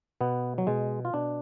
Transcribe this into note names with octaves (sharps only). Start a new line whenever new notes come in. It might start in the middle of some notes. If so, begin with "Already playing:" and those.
B2 B3
F#3
B2 G#3
F4
B2 D4